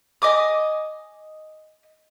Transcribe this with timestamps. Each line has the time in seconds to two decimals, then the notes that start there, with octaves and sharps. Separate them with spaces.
0.22 D#5 G#5 D6 D#6